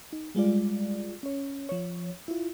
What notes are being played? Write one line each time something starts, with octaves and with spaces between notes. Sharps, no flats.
D#4
G3 G#3 F4 D5
C#4 C#5
F3 C#5
E4 F4